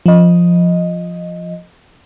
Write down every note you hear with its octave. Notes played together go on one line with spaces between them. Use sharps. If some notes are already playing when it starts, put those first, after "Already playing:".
F3 D#5